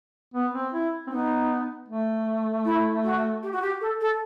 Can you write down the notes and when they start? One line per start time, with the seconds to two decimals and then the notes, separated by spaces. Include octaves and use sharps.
0.34 B3
0.54 C4
0.73 E4
1.07 C4
1.12 B3 D#4
1.88 A3
2.65 E4
3.04 F#4
3.43 G4
3.52 F#4
3.62 G4
3.81 A4
4.00 A4